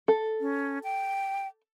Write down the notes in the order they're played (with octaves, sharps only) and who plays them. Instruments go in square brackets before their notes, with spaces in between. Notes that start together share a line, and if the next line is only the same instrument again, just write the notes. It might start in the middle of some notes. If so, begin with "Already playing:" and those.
[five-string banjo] A4
[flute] C#4
G5